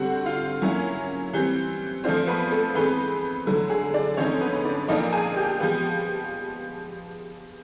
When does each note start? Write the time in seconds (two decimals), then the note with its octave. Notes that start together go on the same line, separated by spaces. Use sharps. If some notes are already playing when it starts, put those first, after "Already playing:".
Already playing: D3 G3 C4 F#4 F#5
0.26 F4 F5
0.62 F#3 A#3 C#4 E4
1.33 E3 G3 C4
2.03 F3 A3 C4 D4 F4 C5
2.27 B3 B4
2.51 A3 A4
2.75 E3 G#3 B3 C4 B4
3.47 D3 F#3 A3
3.70 G#3 G#4
3.94 D4 D5
4.17 D3 F3 A3 C4 C#4 D#4 C#5
4.41 B3 B4
4.65 D4 D5
4.88 A#2 F3 A#3 D4 D#4 D#5
5.12 G#4 G#5
5.36 G4 G5
5.60 F3 G#3 B3